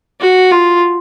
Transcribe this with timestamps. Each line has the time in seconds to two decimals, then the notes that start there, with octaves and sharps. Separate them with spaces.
0.20 F#4
0.51 F4